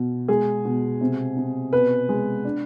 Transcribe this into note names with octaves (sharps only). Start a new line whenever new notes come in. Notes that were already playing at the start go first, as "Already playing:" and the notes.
Already playing: B2
G#3 G#4
B2
C3
C3
B2 B4
G#3
D4